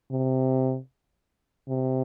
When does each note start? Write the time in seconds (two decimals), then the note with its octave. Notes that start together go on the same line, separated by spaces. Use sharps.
0.11 C3
1.68 C3